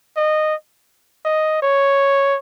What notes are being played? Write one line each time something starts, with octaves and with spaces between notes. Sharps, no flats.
D#5
D#5
C#5